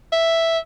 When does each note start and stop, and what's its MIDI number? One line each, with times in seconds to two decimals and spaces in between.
0.12 0.58 76